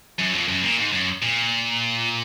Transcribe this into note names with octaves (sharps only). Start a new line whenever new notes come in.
F#2
F2
F#2
A#2
G#2
F#2
A#2